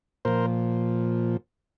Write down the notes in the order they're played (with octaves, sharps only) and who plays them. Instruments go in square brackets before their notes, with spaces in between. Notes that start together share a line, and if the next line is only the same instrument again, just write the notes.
[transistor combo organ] A#2 F3 A#4 C5